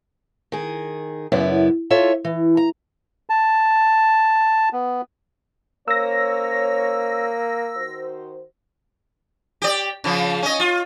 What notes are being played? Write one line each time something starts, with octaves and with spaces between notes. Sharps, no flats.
D#3 G#4
F#2 C#3 B3 E4 D5
F4 A4 C#5 E5
E3
A#5
A5
B3
A#3 C#4 C5 C#5 E6 A#6
D#3 F#4 C5
G4 D5
C#3 F3
C#4 D#5
F4